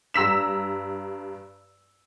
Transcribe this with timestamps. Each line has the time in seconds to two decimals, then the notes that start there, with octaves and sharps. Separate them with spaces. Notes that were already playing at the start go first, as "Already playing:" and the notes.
0.14 G2 A#5 E6 B6 E7